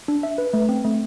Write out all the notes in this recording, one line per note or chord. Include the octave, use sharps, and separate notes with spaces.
D4
E5
B4
A3
C4
A3